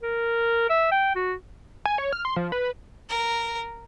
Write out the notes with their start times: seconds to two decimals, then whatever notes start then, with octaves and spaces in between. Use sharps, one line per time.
0.03 A#4
0.69 E5
0.91 G5
1.15 F#4
1.85 G#5
1.98 C#5
2.13 F6
2.25 C6
2.36 F3
2.52 B4
3.09 A#4